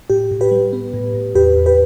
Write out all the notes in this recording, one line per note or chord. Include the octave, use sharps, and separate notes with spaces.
A2 G4
A2
G4 B4
G3
B3
A2
A2
E2 G4 B4
E2
G4 B4